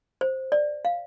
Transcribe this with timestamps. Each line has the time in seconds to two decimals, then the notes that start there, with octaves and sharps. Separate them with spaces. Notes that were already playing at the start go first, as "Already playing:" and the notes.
0.21 C5
0.52 D5
0.85 F5